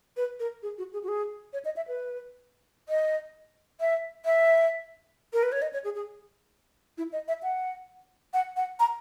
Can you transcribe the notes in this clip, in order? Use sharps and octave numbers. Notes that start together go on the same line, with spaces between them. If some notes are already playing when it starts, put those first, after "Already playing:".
B4
A#4
G#4
F#4
G#4
F#4
G#4
C#5
D#5
E5
B4
D#5
E5
E5
A#4
B4
C#5
D#5
C#5
G#4
G#4
E4
D#5
E5
F#5
F#5
F#5
A#5